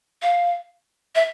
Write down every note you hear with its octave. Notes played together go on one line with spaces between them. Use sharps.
F5
E5